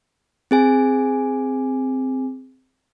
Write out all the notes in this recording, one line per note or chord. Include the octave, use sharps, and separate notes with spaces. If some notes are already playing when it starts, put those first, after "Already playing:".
C4 G#4 G#5